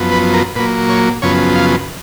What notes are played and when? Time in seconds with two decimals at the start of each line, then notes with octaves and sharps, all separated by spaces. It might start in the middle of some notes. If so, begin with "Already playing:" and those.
Already playing: F#2 F3 B3
0.12 B4
0.34 A#4
0.56 A#2 F#3 A#3 B4
0.89 C#5
1.22 F#2 C#3 F3 B3 C#5
1.56 F5